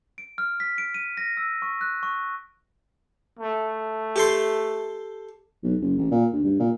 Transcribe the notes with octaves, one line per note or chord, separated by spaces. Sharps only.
D7
F6
B6
D7
D#7
A#6
E6
C#6
F#6
C#6
A3
G4 A4 C6
B1
F#1
A1
A#2
D2
G2
A#2